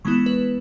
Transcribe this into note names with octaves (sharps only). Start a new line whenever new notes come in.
E3 G#3 B3 E4 C#6
B4